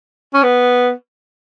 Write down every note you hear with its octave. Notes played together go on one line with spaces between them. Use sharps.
C#4
B3